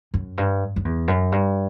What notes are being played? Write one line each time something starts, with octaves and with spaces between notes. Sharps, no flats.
F#2
G2
F#2
E2
F#2
G2